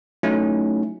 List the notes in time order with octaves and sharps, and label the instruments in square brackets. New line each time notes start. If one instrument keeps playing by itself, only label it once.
[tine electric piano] F#3 A3 C#4 D#4 E4